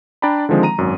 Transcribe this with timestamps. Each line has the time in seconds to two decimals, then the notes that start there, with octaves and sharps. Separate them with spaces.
0.22 D4 D5 G5 A#5 B5
0.49 D3 D#3 F3 G#3 C4
0.63 A#5 D#7
0.78 G#1 F#2